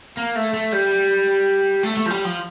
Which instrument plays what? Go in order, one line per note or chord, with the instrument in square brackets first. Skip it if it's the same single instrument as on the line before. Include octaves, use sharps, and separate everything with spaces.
[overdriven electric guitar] A#3
A3
A3
G3
A3
A3
F3
G3
F3